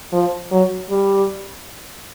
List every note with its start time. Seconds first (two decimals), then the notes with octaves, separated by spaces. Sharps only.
0.13 F3
0.51 F#3
0.90 G3